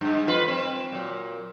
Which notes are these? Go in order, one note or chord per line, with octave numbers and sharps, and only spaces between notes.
G2 G#3
F2 F4 B4
C4
A#2 F#3